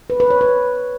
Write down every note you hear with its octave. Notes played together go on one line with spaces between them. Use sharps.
B4
B4
C#5
B4